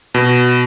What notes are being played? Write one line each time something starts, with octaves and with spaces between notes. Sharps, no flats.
B2